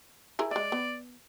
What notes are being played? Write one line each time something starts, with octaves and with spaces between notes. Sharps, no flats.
E4 G#4 A#4
G#3 D5 E5
B3